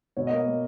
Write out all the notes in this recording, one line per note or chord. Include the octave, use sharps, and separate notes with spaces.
B2 C#5
D#5
A#3
D#5
A#3